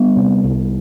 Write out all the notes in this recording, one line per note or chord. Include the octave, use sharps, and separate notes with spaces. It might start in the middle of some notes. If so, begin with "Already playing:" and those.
Already playing: G3 B3
C3
C2